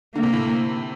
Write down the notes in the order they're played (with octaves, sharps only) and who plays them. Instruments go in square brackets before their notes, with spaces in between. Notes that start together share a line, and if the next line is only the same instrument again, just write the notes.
[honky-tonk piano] D3 [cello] A#3
[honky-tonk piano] C3
A2